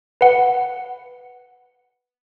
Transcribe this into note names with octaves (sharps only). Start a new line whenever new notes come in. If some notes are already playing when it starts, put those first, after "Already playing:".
B4 F#5